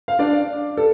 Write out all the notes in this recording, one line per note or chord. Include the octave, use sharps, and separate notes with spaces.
F5
D4 D5
A4